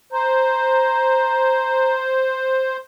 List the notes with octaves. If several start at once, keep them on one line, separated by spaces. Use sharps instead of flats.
C5 A#5